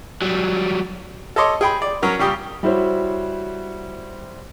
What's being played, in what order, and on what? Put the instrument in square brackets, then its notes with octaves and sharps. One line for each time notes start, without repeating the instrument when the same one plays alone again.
[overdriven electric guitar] F#3 G3
[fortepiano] A4 C#5 D#5 C6 D6
G#4 G5 B5
D5
F#3 C#4 A#4
C#3 G3 G4 D#6
[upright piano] G3 E4 F#4 C5 C#5